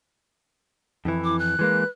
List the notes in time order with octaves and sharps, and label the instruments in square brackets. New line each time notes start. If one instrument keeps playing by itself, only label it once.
[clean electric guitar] F2 E3 [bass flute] E4
[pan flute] D6
F#6
[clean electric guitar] E3 G#3 A#3 [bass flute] B4